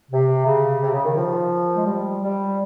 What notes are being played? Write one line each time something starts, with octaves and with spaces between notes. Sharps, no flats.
C3
C#3
C3
C#3
D#3
F3
G#3
G3
G3